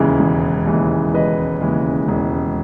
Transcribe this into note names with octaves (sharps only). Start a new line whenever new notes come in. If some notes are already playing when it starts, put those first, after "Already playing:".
Already playing: E1 D#2 C#3 E3 G#3
E1
D#2 C#3 E3 G#3
E1 B4 D#5
D#2 C#3 E3 G#3
E1